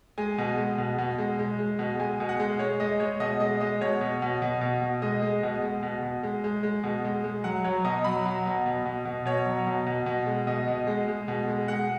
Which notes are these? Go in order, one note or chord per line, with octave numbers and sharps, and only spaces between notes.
G#3 G#5
B2
G#3
B2
B2
G#3
G#3
G#3
B2
G#3 G#5
B2
F#5
G#3
G#3 C#5
G#3 D#5
G#3 C#5
B2 D#5
G#3 D#5
G#3 D#5
B2 C#5
B2
B2
B2
B2
B2
G#3 D#5
G#3
B2
G#3
B2
B2
G#3
G#3
G#3
B2
G#3
G#3
F#3 F#5
F#3 C#5
B2 D#5
F#3 B5
F#3
B2
B2
B2
B2
B2 C#5
F#3
B2
B2
B2
G#3
B2 D#5
B2
G#3
G#3
B2
G#3
G#3 F#5